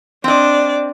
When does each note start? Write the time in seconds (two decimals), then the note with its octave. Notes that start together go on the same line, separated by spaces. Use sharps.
0.24 C4 D4 D5 D#5